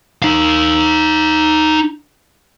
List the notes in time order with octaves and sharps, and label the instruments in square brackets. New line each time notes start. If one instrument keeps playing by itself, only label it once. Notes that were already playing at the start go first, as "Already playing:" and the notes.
[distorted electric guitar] D#4 F5